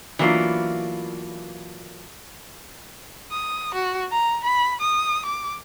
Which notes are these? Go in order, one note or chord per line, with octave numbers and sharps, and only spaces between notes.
E3 F#3 A#3 B3 D4 F4
D#6
F#4
A#5
B5
D#6
D6